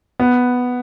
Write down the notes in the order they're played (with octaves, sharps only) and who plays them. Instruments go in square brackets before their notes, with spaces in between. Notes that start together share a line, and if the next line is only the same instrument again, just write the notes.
[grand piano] B3